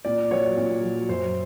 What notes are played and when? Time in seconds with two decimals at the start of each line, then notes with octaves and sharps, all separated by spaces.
0.05 A#2 D5
0.31 F#3 C#5
0.57 A#2
0.83 F#3
1.09 F#2 C5